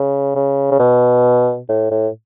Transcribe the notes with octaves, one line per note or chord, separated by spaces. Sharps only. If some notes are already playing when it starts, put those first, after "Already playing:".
Already playing: C#3
C#3
C#3
B2
A2
A2